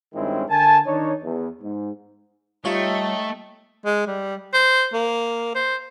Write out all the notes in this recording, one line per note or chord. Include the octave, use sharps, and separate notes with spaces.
G2 D#3 G#3 C4 C#4 E4
D3 A#4 G#5 A5
D#3 D4 D#4 C#5
E2
G#2
G3 A3 D#4 F4 C#5 G5
G#3
G3
C5
A#3
C5